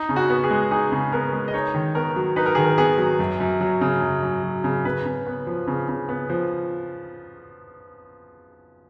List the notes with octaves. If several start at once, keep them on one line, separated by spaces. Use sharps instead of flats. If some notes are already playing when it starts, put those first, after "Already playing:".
Already playing: D#4
C#3
F#4
B3
G#4
G#3
D#4 G#4
C#3
B3 A#4
G#3
D#5
D#4 C#5
D#3
B3 A#4
F#3
D#4 B4
A#4
D#3 G#4
A#4
B3 G#4
F#3
F#2
F#2
F#3
C#3
F#2
F#2
F#3
C#3
C#3 B4
C#3
B3
F3
C#3
C#3
B3
F3